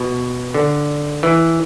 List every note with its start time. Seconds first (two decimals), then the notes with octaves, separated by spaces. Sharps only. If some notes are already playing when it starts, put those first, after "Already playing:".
Already playing: B2
0.54 D3
1.23 E3